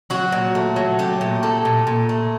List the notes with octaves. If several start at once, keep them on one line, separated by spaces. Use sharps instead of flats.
F#3 F#4
A#2
A3
F#3
A3 G4
A#2
A3 A4
A#2
A#2
A3